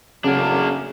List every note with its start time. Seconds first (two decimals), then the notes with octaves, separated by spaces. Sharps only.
0.24 F#2 A2 C#3 F#3 A#3 D4